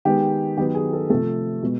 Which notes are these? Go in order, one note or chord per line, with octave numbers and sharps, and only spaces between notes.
D#3 G#3 B3 G4
D#3 F#3 B3 G4
G#4
A4
C3 F3 A3 A4
B2 G#3 B3